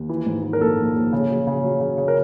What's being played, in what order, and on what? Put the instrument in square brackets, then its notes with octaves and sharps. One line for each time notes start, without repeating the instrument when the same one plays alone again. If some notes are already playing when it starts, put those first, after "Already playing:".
Already playing: [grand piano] D#2
E3
G#2
E3
A#4
A#1 A4
A#1
A#1
C#3
F#3
C#3
F#3
C#3
C#3
A#4